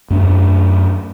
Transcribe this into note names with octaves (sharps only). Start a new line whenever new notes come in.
F#2 A3 D4